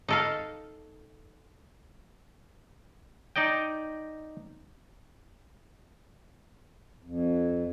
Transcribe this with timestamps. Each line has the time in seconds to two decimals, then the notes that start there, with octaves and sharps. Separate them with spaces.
0.08 D#4 A4 F5
3.36 D#4 D5 D#5 G5
7.04 F2